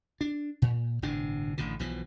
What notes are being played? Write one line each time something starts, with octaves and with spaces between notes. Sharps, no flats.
D4
A#2
G1 A2 C3 D4
A1 A2 D3
B1 B2 E3 F3